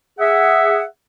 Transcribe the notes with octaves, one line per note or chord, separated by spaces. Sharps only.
G#4 E5 F#5